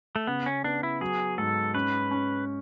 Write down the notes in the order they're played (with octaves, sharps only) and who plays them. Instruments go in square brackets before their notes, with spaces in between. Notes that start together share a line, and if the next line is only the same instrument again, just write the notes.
[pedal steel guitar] A3
[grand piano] C#3 [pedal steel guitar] B3
[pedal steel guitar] C#4
[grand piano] B3 [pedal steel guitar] D4
[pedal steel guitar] E4
[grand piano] F#3 [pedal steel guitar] G#4
[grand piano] G#2 [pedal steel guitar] A4
[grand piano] C#4 [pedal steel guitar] B4
[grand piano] C#4